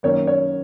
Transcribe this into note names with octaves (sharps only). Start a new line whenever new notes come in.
F#2 D#3 A#3 C#5
C#5